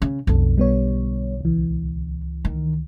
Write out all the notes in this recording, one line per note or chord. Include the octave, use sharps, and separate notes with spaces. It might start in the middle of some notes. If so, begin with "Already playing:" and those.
C#3
B1 F2 D3 A4
G3 B3 C#5
C#2 E3
D#3